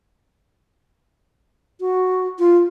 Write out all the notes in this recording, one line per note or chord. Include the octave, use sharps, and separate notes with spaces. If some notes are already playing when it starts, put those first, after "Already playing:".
F#4
F4